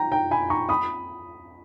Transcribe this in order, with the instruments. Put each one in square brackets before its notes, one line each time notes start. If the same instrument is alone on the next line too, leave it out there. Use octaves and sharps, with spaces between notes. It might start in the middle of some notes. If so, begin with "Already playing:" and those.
Already playing: [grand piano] G5 A#5
G5 A#5
G#5 B5
A#5 C#6
B5 D#6